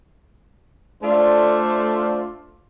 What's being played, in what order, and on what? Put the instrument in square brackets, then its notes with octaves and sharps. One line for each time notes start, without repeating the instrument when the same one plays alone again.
[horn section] A3 D4 F4 A4 C5 D5